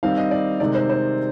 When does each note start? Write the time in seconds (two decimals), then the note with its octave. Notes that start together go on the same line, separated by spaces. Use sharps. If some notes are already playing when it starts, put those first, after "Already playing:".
0.03 D#3 G3 C4 D#4 F5
0.17 D#5
0.31 D5
0.60 C3 D#3 G#3 C4 D#4 D5
0.75 C5
0.90 C5